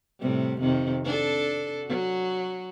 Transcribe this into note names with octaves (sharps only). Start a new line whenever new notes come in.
A2 C3 G3
F2 C3 D#3
D4 A4
F#3 F#4